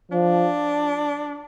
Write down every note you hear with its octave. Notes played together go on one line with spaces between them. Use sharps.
F3 D4